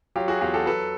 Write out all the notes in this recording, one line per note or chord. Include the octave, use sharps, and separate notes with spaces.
F#3 F4 G4
F#4 G#4
E2 F4 G4
G4 A4
F#3 A4 B4